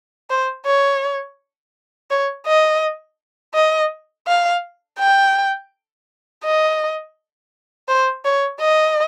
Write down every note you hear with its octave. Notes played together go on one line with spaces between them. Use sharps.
C5
C#5
C#5
D#5
D#5
F5
G5
D#5
C5
C#5
D#5